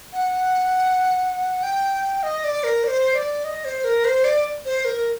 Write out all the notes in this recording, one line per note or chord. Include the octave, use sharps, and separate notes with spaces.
F#5
G5
D#5
D5
A#4
D5
C5
D5
D#5
C5
A#4
C5
D5
C5
A#4